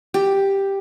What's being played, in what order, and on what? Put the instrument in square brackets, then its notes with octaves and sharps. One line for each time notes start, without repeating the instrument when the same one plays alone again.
[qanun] G4